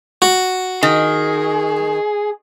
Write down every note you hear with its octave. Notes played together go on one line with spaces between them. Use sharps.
F#4
D#3 G#4